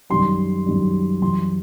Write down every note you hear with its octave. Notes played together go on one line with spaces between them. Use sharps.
F#2 D#3 G3 C6
F#2 D#3 G3
F#2 E3 G3 C6